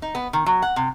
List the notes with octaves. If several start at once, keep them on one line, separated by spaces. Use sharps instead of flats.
D#4
B3
D#3
F#3
F#5
C3